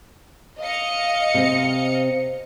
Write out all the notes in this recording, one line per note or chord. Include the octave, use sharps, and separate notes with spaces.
D#5 F5 C#7
C3 C4